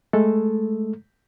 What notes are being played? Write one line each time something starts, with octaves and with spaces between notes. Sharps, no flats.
G#3 A3 A4